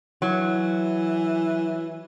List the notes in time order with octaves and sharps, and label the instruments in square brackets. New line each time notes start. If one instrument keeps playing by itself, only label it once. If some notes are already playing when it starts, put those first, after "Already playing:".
[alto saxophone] E3 [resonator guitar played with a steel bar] F#3